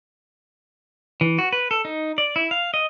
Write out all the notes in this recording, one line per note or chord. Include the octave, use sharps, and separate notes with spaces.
E3
F#4
B4
A4
D#4
D5
E4
F5
D#5